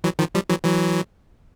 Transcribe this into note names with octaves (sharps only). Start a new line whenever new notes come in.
E3 F#3
D#3 F3
F3 G3
E3 F#3
E3 F#3